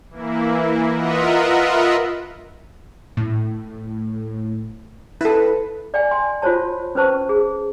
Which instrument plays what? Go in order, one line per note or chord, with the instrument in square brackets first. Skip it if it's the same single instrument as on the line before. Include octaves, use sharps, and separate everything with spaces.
[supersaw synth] E3 A#3 E4
F4 A#4 B4 D#5 E5 F#5
[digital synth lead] A2
[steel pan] E4 A4 [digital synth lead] B4
[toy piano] D5 G5 G#5
G#5 C6
F4 F#4 C5 C#5 A5
C#4 B4 C5 A5 C#6
G#4